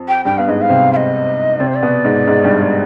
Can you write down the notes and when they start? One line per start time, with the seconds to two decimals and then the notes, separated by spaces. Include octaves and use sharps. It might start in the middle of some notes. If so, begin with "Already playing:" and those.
Already playing: F2
0.08 G5
0.25 G2 G3 G5
0.38 B3 F5
0.48 G#2 G#3 D#5
0.62 F5
0.70 C3 C4
0.93 F5
0.96 D#5
1.60 C3 C4 D5
1.67 C5
1.75 D5
1.82 B2 B3
2.04 G#2 G#3
2.27 G#2 G#3
2.44 G2 G3
2.61 G#3